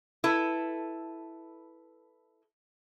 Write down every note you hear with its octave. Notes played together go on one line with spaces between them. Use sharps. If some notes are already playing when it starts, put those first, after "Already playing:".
E4 A4 B4